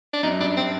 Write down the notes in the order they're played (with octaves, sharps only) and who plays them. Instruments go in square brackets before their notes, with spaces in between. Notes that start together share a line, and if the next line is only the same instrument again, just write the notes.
[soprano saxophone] D4
[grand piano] F#2 [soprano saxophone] D#4
[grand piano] G2 [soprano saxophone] D4
[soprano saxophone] C4